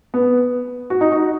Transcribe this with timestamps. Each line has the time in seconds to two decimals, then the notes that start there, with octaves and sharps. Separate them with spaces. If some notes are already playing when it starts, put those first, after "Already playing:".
0.14 B3
0.90 F#4
1.01 D#4
1.12 F#4